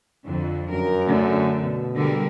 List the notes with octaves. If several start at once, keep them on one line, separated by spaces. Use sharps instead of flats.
F2 D3
F#2 A#4
D3 A3
B2
D3 G3 A#4